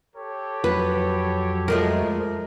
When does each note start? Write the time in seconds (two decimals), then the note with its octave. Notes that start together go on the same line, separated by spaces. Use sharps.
0.15 G4 A4 C#5
0.64 F2 F#3 B4
1.68 F3 G#3 A3 A#4